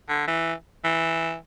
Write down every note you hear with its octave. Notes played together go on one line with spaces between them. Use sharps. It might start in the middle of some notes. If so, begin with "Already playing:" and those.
D3
E3
E3